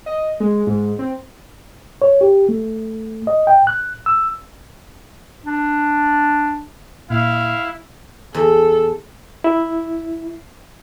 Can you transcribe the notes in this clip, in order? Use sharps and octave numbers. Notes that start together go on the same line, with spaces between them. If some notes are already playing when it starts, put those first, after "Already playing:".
D#5
G#3
G#2
C4
C#5
G4
A3
D#5
G5
F#6
E6
D4
A#2 E4 F5
E2 A4
E4